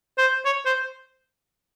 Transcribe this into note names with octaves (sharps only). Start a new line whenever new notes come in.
C5
C#5
C5